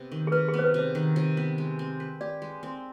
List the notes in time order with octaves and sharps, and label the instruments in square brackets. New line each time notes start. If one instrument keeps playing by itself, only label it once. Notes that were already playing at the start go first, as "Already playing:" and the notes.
Already playing: [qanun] C3 B3
D#3
[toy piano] G#4
[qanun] C3 [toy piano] B4
[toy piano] G#4
[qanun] B3
[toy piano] C5
B4
[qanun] C3 [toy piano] C5
[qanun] D#3
C3
B3
G#3
C4
B4
[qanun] G4 [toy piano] D5
[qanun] G#3
C4